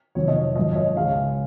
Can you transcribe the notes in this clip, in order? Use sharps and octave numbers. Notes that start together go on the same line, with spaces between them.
F1 F2 D#3 F#3 C#5
D#5
C#5
G#1 F#2 F3 D#5
C#5
D#5
C#2 C#3 G#3 C#4 F5